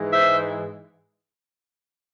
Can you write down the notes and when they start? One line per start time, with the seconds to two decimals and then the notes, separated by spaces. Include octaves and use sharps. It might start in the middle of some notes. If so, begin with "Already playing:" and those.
Already playing: G#2 E3 G#3
0.12 C5 E5